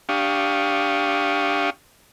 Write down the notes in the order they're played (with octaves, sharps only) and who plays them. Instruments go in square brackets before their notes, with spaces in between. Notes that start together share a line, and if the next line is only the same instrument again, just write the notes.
[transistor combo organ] D4 G4 F5 C#6 D#6